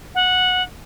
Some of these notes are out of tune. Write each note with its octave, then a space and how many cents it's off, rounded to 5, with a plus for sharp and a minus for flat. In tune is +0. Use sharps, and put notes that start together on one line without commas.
F#5 -15